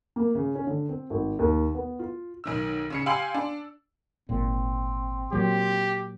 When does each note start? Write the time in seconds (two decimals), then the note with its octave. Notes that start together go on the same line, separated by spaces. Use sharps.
0.16 A#3
0.35 C#3
0.55 C#4
0.67 D3
0.89 C4
1.10 G#1
1.39 D#2
1.75 B3
1.99 F4
2.44 B1 D#3 E6
2.90 C#3 C#4 C#7
3.06 G4 F5 G#5 C6 E6 F#7
3.34 D4
4.29 G#1 A#2 C4
5.33 A#2 F#3 G4